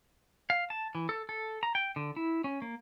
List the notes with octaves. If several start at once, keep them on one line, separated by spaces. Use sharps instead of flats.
F5
A5
E3
A4
A4
A#5
G5
D3
E4
C#4
A#3